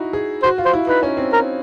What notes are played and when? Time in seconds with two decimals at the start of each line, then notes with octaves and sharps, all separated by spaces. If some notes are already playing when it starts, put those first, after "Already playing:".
Already playing: D#4 E4 F#4
0.13 G#4
0.43 F#4 C5
0.58 F4
0.65 C5
0.73 E4
0.87 D#4 B4
1.03 C#4
1.17 C4
1.33 A#4